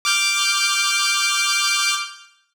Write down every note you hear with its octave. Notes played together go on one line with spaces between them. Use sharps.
D6 F6 G6